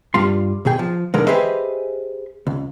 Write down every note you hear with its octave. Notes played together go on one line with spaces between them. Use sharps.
G2 G3 F4 C6
C2 B2 G#4 G5
F3
B1 D3 E3 G#3 A#4
G4 G#4 B4 C5 D#5 E5
C#2